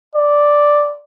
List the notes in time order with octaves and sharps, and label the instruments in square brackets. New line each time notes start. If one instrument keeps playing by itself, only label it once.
[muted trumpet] D5